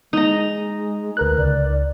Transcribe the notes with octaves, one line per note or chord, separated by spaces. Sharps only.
G#3 D#4 A#5
D2 A#4 B4 F#6
C#2 D5